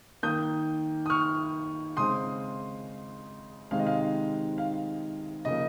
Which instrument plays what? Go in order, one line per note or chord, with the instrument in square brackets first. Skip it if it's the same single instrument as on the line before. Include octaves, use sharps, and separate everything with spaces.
[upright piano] D#3 A#3 D#6 G6
D#6
C#6 F6
C#3 G#3 C4 C6 D#6
C3 D#3 G#3 C4 F5
D#5
F5
F5
C#3 F3 A#3 D#5